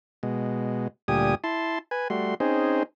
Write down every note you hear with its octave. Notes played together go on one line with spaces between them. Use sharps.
B2 G#3
D2 A#2 G3 G4 G#5 D#6
E4 A5 C6
B4 G#5
G3 A3 F#4 C6
C4 C#4 D#4 G#4 C5